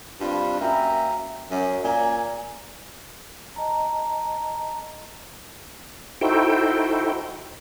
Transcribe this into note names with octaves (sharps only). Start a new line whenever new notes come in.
G2 C4 D4 F4 B5
F#2 A#3 E5 G5 A#5
F#2
A#2 A#3 D5 G#5 A#5
D#5 A5 A#5
D#4 E4 F#4 A4 C5 G5